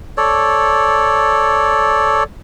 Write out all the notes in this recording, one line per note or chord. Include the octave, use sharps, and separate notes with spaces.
A4 C#5 D5